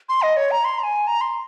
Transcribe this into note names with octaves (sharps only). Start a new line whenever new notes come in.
C6
D#5
C#5
A#5
C6
A#5
G#5
A#5
C6